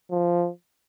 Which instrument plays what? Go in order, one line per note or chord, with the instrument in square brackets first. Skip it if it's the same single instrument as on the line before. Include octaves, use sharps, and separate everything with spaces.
[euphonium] F3